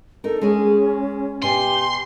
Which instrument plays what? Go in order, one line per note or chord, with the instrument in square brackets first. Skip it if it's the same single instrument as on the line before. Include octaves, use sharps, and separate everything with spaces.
[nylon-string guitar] D#4 A#4 [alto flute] A4
[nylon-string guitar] G#3 G#4 [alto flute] C#4
[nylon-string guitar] B2 G#5 [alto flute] G4 [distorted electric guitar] C6